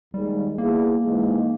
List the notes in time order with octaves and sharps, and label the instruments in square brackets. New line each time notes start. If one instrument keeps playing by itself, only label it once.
[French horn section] D#2 D#3 G#3 [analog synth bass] G3
[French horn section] G3 B3 E4 G#4 [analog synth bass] A#3
[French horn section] G#2 E3 G#3